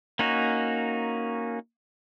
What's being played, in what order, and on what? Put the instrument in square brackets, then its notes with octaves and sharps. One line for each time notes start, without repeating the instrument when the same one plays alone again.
[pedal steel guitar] A#3 C#4 D#4 F#4